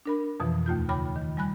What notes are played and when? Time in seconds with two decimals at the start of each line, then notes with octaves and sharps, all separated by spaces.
0.06 D4 A#4 B5
0.40 F2 B2 E3 F3
0.66 D#2 A3 F4 G6
0.89 C#3 G5 B5 D6
1.16 D#3
1.37 G3 G#5 B5 F#6